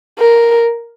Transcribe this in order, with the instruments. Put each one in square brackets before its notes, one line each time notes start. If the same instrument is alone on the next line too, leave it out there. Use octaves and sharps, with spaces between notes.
[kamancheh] A#4